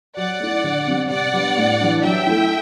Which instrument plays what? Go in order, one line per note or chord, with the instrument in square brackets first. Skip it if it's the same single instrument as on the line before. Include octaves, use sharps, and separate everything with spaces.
[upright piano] F#3 [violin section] D5 F#5
[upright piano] A3 E4
D3
G3 C4
[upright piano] C3 [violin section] D5 F#5
[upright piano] G3 B3 D4
A2
E3 G3 D4
[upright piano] F#3 [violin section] E5 G5
[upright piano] A3 E4